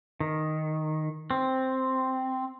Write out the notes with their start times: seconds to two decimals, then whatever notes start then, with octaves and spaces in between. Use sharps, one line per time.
0.20 D#3
1.31 C4